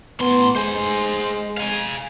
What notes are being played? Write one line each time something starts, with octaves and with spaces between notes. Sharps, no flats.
A2 B3 C6
G#3 C5 G#5
F5 G#5